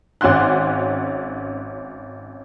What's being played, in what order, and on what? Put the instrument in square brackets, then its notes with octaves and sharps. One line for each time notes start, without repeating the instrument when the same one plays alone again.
[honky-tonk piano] G#1 C#4 F#4 C6 F#6